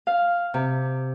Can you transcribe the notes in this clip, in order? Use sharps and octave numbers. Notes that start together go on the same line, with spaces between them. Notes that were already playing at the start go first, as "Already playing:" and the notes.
F5
C3